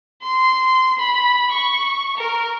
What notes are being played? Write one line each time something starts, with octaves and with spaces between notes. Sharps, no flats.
C6
B5
C#6
A#4